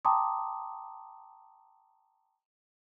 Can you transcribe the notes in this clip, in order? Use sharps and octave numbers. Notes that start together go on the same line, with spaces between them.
G5 A5 A#5 C6 D6 D#6